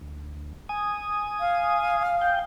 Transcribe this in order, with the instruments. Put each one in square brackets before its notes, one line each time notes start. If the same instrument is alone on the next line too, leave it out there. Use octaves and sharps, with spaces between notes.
[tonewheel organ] D2
G#5 D#6
[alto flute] F5
[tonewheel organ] G5 G6